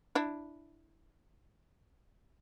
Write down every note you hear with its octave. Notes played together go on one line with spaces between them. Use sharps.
D4 E4